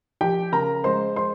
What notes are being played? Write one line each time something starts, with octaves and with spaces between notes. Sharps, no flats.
F3 G4 G5
C#3 A#4 A#5
G#3 C5 C6
C5 C6